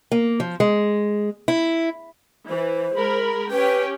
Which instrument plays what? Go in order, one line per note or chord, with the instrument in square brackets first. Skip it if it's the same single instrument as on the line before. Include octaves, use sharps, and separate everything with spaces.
[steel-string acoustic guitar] A#3
F3
G#3
E4
[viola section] E3 [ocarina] C5
[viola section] G#3 A#4 B5
[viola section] C#4 G4 G5 [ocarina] B4